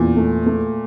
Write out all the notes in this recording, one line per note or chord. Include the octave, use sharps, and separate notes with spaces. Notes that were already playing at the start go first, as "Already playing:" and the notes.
Already playing: E2 A#2
A3
A3